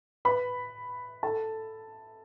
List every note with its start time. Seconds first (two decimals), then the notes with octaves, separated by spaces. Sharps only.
0.25 B4 B5
1.23 A4 A5